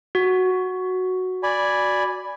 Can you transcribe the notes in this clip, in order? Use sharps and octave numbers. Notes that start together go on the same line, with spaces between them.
F#4
D5 G#5 B5